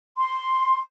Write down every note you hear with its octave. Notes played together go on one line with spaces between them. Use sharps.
C6